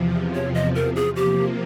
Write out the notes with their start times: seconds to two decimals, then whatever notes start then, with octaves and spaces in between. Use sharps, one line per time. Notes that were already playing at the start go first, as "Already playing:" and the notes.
Already playing: E2 C3 F3
0.35 C#5
0.54 D#5
0.75 A#4
0.96 G#4
1.16 C3 F3 A#3 G4